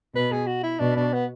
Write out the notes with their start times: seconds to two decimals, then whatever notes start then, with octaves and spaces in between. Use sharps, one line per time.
0.15 B2 B4
0.32 G#4
0.47 F#4
0.63 E4
0.79 B2 D4
0.96 D4
1.13 B3